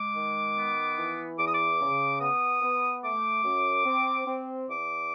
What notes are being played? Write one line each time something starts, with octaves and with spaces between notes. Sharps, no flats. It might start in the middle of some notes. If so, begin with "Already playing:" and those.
Already playing: G#3 D6
D#3
B3
E3
E2 D6
D#6
D6
C#3
B3 D#6
B3
A3 D6
F#2
C4
C4
E2 D6